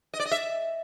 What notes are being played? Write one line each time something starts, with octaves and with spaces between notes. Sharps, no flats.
D#5
D5
D#5
E5